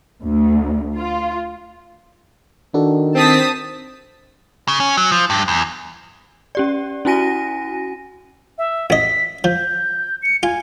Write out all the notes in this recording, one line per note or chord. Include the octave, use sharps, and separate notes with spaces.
D2
F4
D#3 D4 F#4 A4
C4 A5 D#6 B6
C#3
C#4
F#3
F3
G2
E2
C#4 G4 D5
C#4 E4 F#4 G#5 A#6 D#7
E5
A1 D#5 B6
F3 G6
C#7
F4 G#5